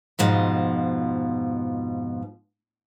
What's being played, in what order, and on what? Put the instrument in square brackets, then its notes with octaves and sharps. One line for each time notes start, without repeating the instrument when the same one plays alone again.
[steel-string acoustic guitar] F2 G#2 B2 F3